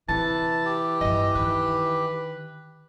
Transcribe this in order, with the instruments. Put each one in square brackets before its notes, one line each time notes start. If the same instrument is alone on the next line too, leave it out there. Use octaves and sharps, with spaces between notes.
[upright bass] C3 [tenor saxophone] E3 [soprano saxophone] A5
[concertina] G4
[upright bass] G2 F3 [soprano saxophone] D#5
[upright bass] D#3 [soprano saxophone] B4